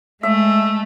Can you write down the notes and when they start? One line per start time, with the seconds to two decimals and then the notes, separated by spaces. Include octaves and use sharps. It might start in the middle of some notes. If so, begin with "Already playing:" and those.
0.23 G#3 A3 E5